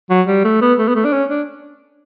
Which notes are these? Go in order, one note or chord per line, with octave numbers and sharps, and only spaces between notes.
F#3
G3
A3
B3
A3
B3
A3
D4
C#4
D4